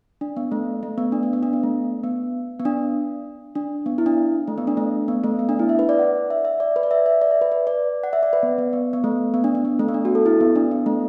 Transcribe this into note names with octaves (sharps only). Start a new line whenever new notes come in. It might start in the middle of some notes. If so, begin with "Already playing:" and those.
D4
B3
A3
A3
B3
D4
B3
B3
D4
B3
A3
B3
B3
D4
D4
B3
E4
D4
A3
B3
D4
A3
B3
A3
B3
D4
E4
E5
B4
D5
F#5
E5
E5
D5
B4
D5
E5
E5
D5
E5
B4
B4
D5
F#5
E5
D5
B4
B3
B3
B3
B3
A3
B3
D4
B3
B3
A3
B3
D4
F#4
A4
E4
B3
D4
B3
A3